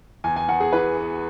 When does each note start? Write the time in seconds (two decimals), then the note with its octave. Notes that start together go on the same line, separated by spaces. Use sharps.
0.24 E2 G#5
0.36 G#5
0.49 E2 F#5
0.60 G#4
0.73 E3 B4
0.97 B3